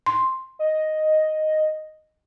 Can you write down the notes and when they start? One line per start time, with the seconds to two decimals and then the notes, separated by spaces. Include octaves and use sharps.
0.06 C6
0.59 D#5